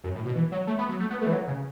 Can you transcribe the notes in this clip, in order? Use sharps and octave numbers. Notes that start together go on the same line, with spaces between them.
F#2
A2
B2
E3
F#3
A3
B3
F#3
A3
B3
A3
E3
F#3
C#3